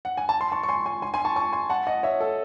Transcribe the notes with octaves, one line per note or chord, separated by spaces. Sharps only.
F#5
G#5
A5
C6
A5 C#6
C#6
G#5 C6
G#5 C6
G#5 C6
G#5 C6
A5 C#6
A5 C#6
G#5 C6
F#5 A5
D#5 F#5
C#5 E5
A4